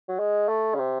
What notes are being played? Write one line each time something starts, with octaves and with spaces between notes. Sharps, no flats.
F#3
G#3
A3
C#3
C3